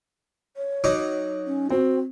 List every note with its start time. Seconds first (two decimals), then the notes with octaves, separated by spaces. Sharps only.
0.56 C#5
0.84 F#3 D#4 D6
1.47 C#4
1.70 C4 F#4